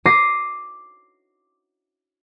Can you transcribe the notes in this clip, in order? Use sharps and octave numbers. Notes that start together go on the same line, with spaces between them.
D6 A#6 C7 D#7